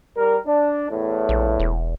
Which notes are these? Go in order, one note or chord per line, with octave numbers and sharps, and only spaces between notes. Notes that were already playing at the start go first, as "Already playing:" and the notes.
G3 A#4
D4
E2 A2
A#1
E1